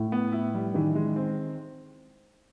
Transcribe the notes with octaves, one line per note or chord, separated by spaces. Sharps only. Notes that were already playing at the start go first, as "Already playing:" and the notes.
Already playing: A2
B3
E4
G3
D#3 E3
G#3
C4